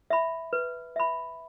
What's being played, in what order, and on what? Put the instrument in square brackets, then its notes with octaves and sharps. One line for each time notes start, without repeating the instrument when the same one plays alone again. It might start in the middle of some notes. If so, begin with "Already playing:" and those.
[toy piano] E5 B5
B4
E5 B5